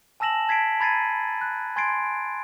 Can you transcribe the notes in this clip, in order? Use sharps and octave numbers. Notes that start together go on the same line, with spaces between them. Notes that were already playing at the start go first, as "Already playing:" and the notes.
G#5 A5 E6 A#6 E7 F#7
A5 G#6 B6 C7 D7
A#5 B5 G#6 A6 C7 D#7
F#6
G#5 C6 G#6 A6 C7 D7